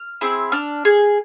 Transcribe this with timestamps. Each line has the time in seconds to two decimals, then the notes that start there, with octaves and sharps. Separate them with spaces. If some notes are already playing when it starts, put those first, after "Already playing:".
Already playing: F6
0.21 C4 E4 G#4
0.52 D4 F6
0.85 G#4